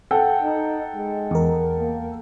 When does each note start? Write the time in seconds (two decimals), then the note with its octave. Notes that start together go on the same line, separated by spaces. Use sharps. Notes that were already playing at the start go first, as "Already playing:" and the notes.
0.11 A4 F#5 G5
0.42 D#4
0.96 G#3
1.31 E2 A#4
1.79 A#3